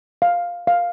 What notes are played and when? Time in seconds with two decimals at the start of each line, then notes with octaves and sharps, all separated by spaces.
0.22 F5
0.67 F5